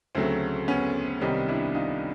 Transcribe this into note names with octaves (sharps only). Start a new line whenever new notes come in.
D2 C#3 F#3 A3 C4
B3 C#4
C2 C3 D#3 G3 B3 C#4 D#4
D4 E4
D#4 F4